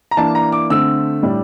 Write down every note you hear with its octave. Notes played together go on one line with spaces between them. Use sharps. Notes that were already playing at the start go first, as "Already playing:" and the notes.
A#5
E3 A#3 D4 A5
A#5
D6
D3 A3 C4 E6
A2 G3 D4